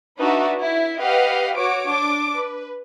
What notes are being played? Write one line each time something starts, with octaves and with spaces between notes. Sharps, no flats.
D4 D#4 F#4 B4 E5
E4
G4 B4 D#5 F5 F#5
F#4 C#5 D6 D7
D4 D6
B4